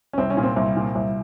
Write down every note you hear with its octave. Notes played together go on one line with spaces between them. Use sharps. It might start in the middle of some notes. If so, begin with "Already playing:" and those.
C#4
C2 C4
C#4
A#2
C4
C2
A#2
C2